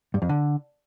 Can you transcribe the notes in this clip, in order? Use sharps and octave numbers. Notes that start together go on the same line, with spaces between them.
G2
F2
D3